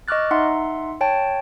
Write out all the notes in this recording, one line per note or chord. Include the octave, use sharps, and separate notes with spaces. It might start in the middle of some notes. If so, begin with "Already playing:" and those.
D#5 C#6 D6 F6 F#6 A6
D#4 E5 F#5 A#5 C6
C#5 G5 A5